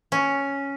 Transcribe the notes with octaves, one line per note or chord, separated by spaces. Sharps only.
C#4